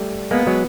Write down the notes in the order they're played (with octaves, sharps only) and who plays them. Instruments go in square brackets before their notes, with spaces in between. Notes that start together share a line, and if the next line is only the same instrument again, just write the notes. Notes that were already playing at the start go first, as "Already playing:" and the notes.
Already playing: [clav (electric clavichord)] G3 A3
[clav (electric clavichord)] G#3 A#3 [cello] B3
[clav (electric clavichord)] F#3 G#3